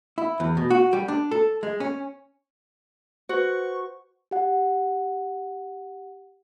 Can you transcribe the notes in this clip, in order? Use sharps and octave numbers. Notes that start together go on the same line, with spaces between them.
E4
E2
B2
F#4
G3
D4
A4
G#3
C#4
F#4 B4 C5 C#6
G4 F#5